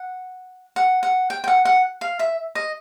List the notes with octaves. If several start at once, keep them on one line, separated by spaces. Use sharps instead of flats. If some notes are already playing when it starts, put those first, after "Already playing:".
Already playing: F#5
F#5
F#5
G5
G5
F#5
F#5
F5
E5
D#5